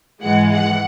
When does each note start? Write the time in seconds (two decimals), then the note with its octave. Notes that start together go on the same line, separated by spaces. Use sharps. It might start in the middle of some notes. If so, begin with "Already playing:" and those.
0.21 G#2 E3 G#3 F#5
0.51 F#5